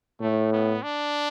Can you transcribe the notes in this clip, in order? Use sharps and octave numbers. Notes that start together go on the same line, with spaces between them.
A2 A3
B3
D4